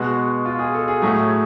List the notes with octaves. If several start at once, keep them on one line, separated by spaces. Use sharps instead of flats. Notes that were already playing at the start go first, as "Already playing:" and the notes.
Already playing: B2 G#3 B3 F#4
F4
G#4
A4
G#4
A2 F#3 A3 G#4